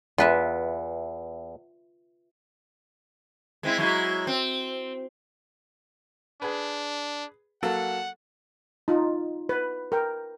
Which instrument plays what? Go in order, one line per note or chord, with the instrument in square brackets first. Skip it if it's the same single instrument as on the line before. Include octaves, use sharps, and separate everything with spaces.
[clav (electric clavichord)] E2 [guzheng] F4 B4 E5
[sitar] G#3 C4 E4
F#3 G#3 E4
C4
[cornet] D4 [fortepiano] G#4 B4
[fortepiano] F#3 A#3 A4 [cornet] F#5
[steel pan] D#4 F4
B4
A#4 G5